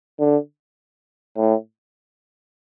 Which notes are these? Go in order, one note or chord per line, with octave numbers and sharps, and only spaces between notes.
D3
A2